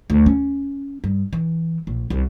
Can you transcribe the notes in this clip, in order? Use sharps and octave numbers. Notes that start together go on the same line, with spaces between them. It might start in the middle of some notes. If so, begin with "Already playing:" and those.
D2
C#4
G2
E3
A#1
C2